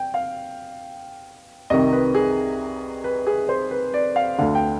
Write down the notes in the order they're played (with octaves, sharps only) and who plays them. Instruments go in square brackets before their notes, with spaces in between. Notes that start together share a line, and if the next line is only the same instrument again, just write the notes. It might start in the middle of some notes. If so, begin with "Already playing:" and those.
Already playing: [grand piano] G5
F5
C2 C3 D#3 D#5
B4
G#4
B4
G#4
C5
B4
D5
F5
D2 D3 F5
G5